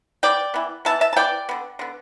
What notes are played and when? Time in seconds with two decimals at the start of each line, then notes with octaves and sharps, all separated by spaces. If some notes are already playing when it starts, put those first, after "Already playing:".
0.23 E3 B3 D5 G5
0.54 E3 B3
0.85 E3 B3 E5 A5
1.01 E5 A5
1.13 A5
1.16 E3 B3 D5 G5
1.49 D3 B3
1.79 D3 B3